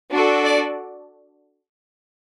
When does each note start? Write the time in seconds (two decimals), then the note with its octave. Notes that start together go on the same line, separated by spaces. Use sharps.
0.11 D4 F#4 A4
0.45 D5